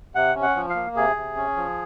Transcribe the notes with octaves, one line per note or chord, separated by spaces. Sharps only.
C3 F#5
C#4
F#5
F3
F5
A#3
C3 G#4
C3
C#4
F3